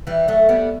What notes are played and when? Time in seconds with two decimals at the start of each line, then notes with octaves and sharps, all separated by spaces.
0.07 E3 G3
0.28 F#3 A3
0.49 G3 B3